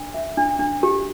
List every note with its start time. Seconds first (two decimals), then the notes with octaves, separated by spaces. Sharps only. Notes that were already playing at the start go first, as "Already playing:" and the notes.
Already playing: D4
0.14 E5
0.37 D4
0.59 D4
0.83 G4